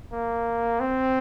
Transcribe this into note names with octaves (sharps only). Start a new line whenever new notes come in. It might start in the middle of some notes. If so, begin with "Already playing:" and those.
A#3
C4